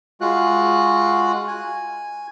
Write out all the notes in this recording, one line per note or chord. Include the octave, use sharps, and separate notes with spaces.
G#3 F4 F#4 F#6
G#5